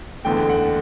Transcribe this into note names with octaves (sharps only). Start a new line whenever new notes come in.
F#1 E2 D3 A3 G5
F#5